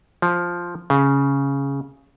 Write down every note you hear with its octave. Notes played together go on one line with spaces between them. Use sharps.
F3
C#3